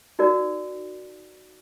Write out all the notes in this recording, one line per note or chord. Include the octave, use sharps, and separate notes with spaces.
D#4 F#4 A#4 D5